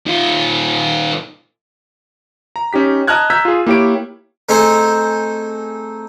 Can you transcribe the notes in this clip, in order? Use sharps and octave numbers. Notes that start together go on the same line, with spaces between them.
D#3 F4
A#5
C#4 D#4 G4 B6
D#5 A5 A#5 F6 F#6 G#6
A#5 E6 G6 G#6 B6
F4 G#4
A#3 E4 G4 C#5 D7
A3 C4 D#4 G#4 C5